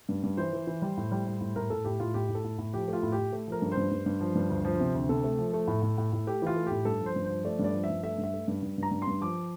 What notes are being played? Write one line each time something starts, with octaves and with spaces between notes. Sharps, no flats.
G2
G2
E3 C5
E3
E3
G3
A2
G3
G3
A2
A2 A#4
A2 A4
A2 G4
A2 F4
A2 G4
A2
A4
A2
A2
F3 G4
A3 F4
A2
G4
A2
A3
F3 A#4
G2
C5
G2
G2
G2
F3
G2
D2
F3
C3
D2
C3 A4
A3
F3
A3
A2
A2
A2
A2
A3 G4
E3 F4
A3
A2 G4
G2 A4
F3
C5
G2
C5
F3
A3 D5
G2
D5
F3
E5
G2
A3 E5
G2
E5
A3
G2
G2
G2
A#5
G2
C6
G2
F3 D6